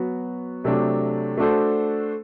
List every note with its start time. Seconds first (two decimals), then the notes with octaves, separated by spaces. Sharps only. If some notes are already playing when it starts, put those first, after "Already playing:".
Already playing: F#3 B3 F#4
0.64 C3 F#3 A3 D4
1.38 A3 D4 F#4 A4 C5